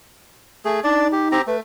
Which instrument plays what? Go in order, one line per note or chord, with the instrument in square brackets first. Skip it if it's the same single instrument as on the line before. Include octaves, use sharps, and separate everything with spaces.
[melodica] A3 G#4
[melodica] D4 D5 [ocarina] D#4
[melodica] G4
C4 G4 A#5
[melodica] A3 [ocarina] B4